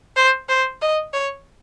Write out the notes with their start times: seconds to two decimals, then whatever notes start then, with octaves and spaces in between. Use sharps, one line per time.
0.16 C5
0.49 C5
0.82 D#5
1.13 C#5